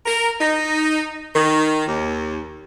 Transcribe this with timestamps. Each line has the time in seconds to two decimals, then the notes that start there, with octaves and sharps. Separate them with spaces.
0.06 A#4
0.39 D#4
1.34 D#3
1.86 D#2